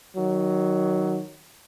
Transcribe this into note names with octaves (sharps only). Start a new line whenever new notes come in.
D#3 F#3